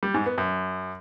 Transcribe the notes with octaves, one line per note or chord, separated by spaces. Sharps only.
G3
G#2
B3
F#2